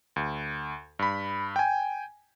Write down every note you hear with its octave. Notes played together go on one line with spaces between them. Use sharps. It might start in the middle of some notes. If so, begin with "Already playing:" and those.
D2
G2 B5
G5 G#5